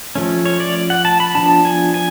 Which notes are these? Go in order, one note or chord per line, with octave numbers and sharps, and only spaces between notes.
F3 A3 C#4
C#5
D5
F#5
A5
B5
F3 B3 D4 A5
G#5
G#5